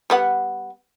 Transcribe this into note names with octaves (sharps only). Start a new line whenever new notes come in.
G3 B3 F#5